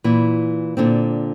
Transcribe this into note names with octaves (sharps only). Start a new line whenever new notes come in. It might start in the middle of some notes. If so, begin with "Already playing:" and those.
A#2 E3
A#2 D3 C4